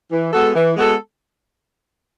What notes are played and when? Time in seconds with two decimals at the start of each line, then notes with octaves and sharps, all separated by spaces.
0.11 E3
0.33 G#3 B3 F#4 A4
0.55 E3
0.76 G#3 B3 F#4 A4